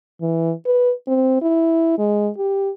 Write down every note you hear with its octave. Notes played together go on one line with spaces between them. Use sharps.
E3
B4
C4
E4
G#3
G4